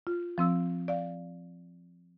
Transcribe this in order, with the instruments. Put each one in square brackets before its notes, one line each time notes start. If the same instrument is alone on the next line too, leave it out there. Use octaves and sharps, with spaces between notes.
[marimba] F4
F3 C4 E6
D5 F5